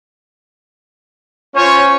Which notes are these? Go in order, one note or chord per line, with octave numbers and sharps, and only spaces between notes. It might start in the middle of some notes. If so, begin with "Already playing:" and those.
C#4 F4 C5 C#5